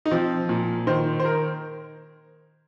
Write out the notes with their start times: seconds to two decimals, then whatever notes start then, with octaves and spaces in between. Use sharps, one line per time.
0.06 D#4
0.11 F3 C4
0.49 A#2
0.87 D#3 C5
1.20 C5
1.25 A#4